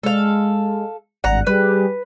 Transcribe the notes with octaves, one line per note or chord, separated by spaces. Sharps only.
G#3 A4 F5
G#1 G2 F#5 A#5
G3 G4 G#4 B4